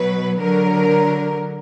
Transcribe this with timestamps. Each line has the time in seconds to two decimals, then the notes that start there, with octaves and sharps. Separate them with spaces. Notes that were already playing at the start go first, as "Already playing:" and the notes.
Already playing: B2 F#3 B4
0.39 D3 F#3 A#4